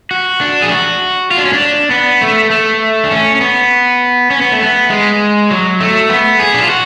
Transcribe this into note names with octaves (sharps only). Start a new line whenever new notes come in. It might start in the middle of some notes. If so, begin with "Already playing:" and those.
F#4
D4
G#4
F#4
F4
D4
C#4
D4
B3
A3
A3
D4
C#4
C#4
B3
C#4
B3
A3
B3
G#3
F#3
A3
B3
G#4
D4
F4
F#4